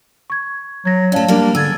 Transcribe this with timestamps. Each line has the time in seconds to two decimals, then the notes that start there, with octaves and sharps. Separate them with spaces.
0.30 C#6 G#6
0.85 F#3 G#6 A#6
1.12 A3 C#4 D5 F5 A5
1.28 G3 A#3 D4 A#4
1.55 D3 G#4 E6 G#6 A6